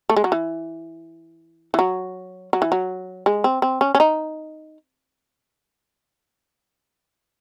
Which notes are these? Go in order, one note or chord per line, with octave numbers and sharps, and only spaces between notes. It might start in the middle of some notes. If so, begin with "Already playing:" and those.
A3
G#3
F#3
E3
E3
F#3
F#3
E3
F#3
G#3
C4
C4
C#4
C#4
D#4